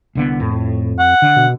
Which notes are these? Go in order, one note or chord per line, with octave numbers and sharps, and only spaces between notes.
C2 D3 B3
F2 A2
F2
F#5
D3
B2